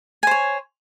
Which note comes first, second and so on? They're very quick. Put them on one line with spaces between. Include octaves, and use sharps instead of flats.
G#5 C5 C#5